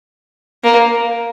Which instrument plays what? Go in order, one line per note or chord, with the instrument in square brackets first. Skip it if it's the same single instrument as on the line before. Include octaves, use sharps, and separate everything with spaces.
[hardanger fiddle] A#3